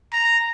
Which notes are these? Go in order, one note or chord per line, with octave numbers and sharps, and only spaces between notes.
A#5